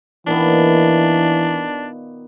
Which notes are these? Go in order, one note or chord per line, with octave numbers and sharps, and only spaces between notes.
A#2 D#3 E3 B3 D4